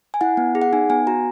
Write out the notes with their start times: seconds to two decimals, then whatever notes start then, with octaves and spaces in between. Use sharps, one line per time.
0.14 G#5
0.21 E4 F#5
0.37 B3
0.55 G#4
0.62 F#5
0.73 D#4 G#5
0.90 B3 G#5
1.07 F#4 A#5